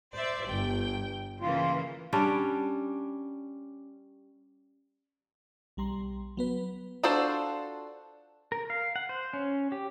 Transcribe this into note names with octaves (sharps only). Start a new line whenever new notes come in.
C5 D5 E5
G1 G5
C#3 E3 A#3 F4
G3 C#4 D4 D5
B1 G3 A#5 C6
F#3 B3 B4
D4 F4 F#4 A4 C5
A#4
F5
F#5
C5
C#4
G4